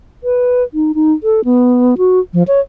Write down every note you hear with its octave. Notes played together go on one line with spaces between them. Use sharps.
B4
D#4
D#4
A4
B3
F#4
F3
C#5